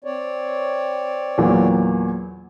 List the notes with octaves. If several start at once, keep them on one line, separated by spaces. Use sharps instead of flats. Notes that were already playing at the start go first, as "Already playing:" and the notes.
C4 C#5 D5
E2 A#2 F#3